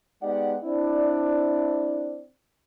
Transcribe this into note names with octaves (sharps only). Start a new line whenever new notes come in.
G#3 B3 D#4 G4 D5 F#5
C4 D4 E4 D5